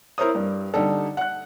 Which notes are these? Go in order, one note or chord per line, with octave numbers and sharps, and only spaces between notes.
E4 A#4 C5 C#5 D#6
G2 G3
D3 G3 D#4 A4
F#5 F#6